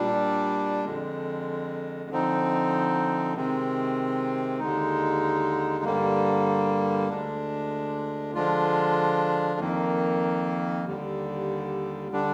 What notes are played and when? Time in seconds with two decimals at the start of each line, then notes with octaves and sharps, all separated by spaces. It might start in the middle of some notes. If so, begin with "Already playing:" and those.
Already playing: A#2 G3 D4
0.85 F2 D3 G#3
2.10 D3 F3 C4 D#4
3.35 C3 D#3 G#3 C4
4.59 D#2 D3 G#3 D#4
5.84 G2 D3 G3 A#3
7.09 D2 D3 G#3 D4
8.35 D3 F3 G#3 D4 F4
9.60 F2 D#3 A#3
10.85 D#2 D3 G3
12.12 D3 G3 D4